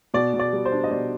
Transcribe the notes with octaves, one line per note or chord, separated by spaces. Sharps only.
B2 D5
B2
D5
G3
C5
D4
D#5
B2 D5